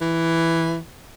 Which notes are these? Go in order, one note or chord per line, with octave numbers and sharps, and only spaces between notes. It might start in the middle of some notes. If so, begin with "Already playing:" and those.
E3